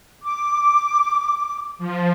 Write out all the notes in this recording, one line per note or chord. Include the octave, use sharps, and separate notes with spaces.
D6
F3